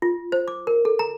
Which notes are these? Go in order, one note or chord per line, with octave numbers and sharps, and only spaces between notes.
F4
C5
D6
A#4
A4
A#5